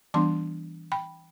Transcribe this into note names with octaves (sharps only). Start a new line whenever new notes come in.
E3 G3 B3 D4 A5 C6
G5 B5